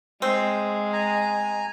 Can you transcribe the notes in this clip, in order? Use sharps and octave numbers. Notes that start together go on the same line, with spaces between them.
G#3 C4
G#5 A#5